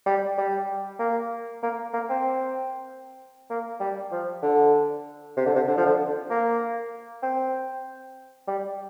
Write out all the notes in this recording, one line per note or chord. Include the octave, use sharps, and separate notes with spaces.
G3
G3
A#3
A#3
A#3
C4
A#3
G3
F3
D3
C3
D3
C3
D3
F3
D3
A#3
C4
G3